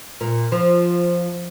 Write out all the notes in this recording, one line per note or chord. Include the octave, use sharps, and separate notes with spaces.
A#2
F3